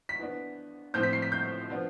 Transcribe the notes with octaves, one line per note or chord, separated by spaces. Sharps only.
B6
E3 B3 D4
A2 F3 C4 F4 G6
B6
C7
B6
G6
F3 B3 D4 F4